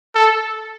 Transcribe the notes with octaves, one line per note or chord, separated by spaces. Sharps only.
A4